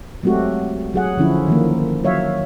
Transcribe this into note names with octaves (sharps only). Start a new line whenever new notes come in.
F#3 G#3 A3 C4 F#4 G4
F#3 G#4 F#5
D3 F3 C#4 E4
D#3 F3 A#3
F#3 C#5 E5 F5